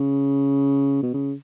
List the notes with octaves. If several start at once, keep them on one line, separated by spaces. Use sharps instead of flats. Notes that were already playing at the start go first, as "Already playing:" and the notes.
Already playing: C#3
B2
C#3